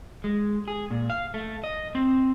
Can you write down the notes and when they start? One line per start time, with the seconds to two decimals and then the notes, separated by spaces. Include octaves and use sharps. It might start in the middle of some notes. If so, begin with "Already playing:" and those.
0.24 G#3
0.68 G#4
0.90 A#2
1.10 F5
1.34 A3
1.64 D#5
1.95 C4